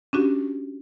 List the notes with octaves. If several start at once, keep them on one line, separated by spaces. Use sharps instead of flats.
C#4 D4 F#4 G4